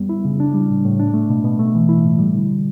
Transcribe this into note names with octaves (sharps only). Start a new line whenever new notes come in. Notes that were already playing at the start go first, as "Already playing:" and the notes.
Already playing: F#2 G3 B3
E4
C#3
D4
G3
A2
A2
D4
A3
B2
B2
A3
E3
E4
A2
G3
D3